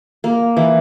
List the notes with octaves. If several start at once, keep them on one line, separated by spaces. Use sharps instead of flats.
A#3
E3